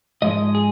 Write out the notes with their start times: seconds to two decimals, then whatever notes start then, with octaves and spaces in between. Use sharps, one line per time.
0.22 G#2 F3 G#3 D#5
0.55 G#4